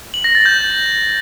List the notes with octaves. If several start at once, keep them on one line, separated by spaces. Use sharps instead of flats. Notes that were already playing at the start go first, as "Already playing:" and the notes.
F#7
A#6
A6
G6